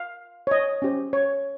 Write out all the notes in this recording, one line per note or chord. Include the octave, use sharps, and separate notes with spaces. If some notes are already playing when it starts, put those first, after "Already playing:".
Already playing: F5
C#5
D#5
C#4 G4 C5
C#5